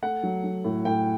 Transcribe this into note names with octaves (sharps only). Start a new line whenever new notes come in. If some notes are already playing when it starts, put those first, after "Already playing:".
A3 F#5
F#3
F#3
A2
A2 G5